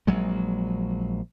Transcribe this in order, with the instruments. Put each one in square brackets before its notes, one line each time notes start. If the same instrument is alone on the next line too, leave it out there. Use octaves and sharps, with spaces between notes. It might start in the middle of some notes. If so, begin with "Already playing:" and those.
[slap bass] A#1 F#3 G#3